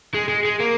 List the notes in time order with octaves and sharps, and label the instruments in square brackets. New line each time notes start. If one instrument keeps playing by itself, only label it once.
[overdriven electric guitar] G#3
G#3
G#3
A#3